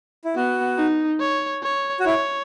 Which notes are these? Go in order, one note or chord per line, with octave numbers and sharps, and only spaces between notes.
E4
B3 F#4
D#4
C#5
C#5
F#4
E4 C#5